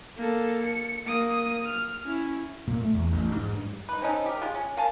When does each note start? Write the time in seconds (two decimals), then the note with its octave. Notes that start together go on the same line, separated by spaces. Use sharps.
0.17 A#3 A4
0.66 C#7
1.07 A#3 D#6
1.65 F6
2.05 C#4 E4
2.67 A#2
2.82 A3
2.94 E2
3.12 A1
3.35 G#2
3.50 G2
3.89 D#4 B4
4.02 C4 C#4 D#4 A4
4.26 G4 A#4
4.42 G#3 F4
4.55 C#4
4.77 A#4 F5 G#5 A5